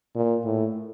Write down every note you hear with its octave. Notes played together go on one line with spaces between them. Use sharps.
A#2
A2